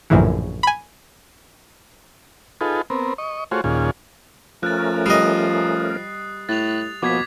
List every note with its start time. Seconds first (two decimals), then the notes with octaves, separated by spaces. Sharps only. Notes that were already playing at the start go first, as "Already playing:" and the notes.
0.10 A#1 F#2 A2 C#3 E3
0.63 G#5 B5
2.61 D#4 F4 G#4 A4 B4
2.90 B3 C4 A#4
3.18 D#5 C#6
3.51 A3 F4 F#4 G#4 C5 C#5
3.64 D#2 A#2 C#4 F4 G#4
4.63 F3 A3 C#4 A#4 F#6 A6
5.06 G3 D#5 D#6 C7
6.49 A2 F#6 A6 F7
7.02 B2 F3 A#3 D6 G#6 B6